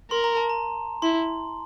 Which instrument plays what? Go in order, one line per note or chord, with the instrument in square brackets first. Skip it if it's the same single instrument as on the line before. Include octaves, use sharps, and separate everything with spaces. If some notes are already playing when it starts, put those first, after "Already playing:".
[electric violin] A#4 [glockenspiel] C6
[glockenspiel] A#5
A5
A#5
[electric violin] E4 [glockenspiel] C6